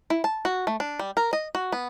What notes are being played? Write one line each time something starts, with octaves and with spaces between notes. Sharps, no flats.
E4
A5
F#4
A3
D4
G3
A#4
D#5
F#4
B3